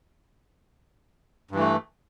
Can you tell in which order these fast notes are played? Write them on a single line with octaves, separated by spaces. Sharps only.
G2 E3 A3